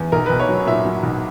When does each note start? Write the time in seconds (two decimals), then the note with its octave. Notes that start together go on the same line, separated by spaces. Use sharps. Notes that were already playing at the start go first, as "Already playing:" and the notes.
Already playing: E2
0.12 B1 A#4
0.26 B1 B4
0.40 C#5
0.49 F#3
0.66 A#2 E5
0.85 F#3
1.03 B1